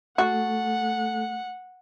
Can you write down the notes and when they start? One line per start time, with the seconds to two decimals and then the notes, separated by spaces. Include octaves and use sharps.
0.18 A3 F#4 A4 F#5